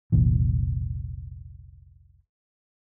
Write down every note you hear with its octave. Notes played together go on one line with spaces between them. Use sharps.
F1 C2 A#2 E3